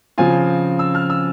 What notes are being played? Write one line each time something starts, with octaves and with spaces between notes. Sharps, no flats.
C#3 F3 C4 F4 G#5
E6
F6
E6